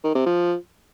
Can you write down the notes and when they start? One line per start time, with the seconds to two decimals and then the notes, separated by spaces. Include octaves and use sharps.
0.04 D#3
0.15 C3
0.26 F3